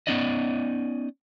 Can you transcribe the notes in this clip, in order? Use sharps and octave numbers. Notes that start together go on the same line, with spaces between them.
B3 C#4 D#4 D5 D#5